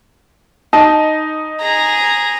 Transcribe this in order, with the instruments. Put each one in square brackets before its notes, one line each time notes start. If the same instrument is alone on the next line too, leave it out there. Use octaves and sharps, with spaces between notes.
[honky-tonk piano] D#4 [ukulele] A5
[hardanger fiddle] G#4 A#5